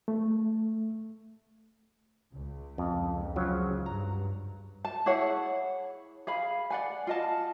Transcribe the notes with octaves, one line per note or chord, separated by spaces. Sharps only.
A3
C#2
F2
C#3 F3 F#3
G2 A#5
A5
E4 G#4 C#5 F#5
G#4 F5 B5
D5 F#5 G#5
F4 D#5 A5